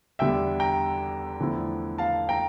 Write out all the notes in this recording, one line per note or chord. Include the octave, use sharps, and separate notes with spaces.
E2 D3 G3 D4 E5 G5
G5 A#5
E2 D3 F3 A3 E4
F5 A5
G5 A#5